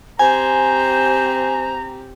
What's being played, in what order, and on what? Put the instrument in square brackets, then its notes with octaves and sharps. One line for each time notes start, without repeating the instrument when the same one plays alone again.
[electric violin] C4 G4 [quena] C5 [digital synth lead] G#5 [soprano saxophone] A#5